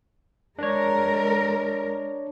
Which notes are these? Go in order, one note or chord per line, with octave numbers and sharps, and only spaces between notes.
G#3 D4 A#4 C#5